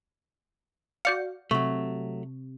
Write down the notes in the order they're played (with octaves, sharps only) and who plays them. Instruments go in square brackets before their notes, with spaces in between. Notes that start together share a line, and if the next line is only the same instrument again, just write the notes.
[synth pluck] F#4 D5 F5 [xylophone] G6 C#7
[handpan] C3 [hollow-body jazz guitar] F#3 A3 [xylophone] C#6